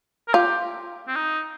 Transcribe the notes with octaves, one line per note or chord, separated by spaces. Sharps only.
A#4
F4 G4
C4
D#4